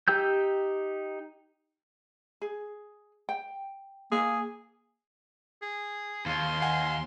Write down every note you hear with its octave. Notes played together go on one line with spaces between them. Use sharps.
D#4 G4 G5 E6 G6
G#4
G5
A#3 G#4
G#4
D#2 F5 C6
F#5 G#5